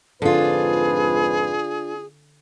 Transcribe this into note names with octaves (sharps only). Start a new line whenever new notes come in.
F2 G#2 D3 D4 F4 G#4 B4